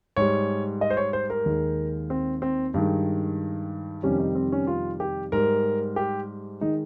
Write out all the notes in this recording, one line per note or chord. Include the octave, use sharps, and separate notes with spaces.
G#2 G3 C#5
D#5
C5
C#5
C5
A#4
D#2 D#3 G#3
C4
C4
G2 D#3 G#3
F2 C3 D#3 G3 C#4
D#4
C4
C#4
F4
G4
G#2 G3 A#4
G4
D#3 G#3 D#4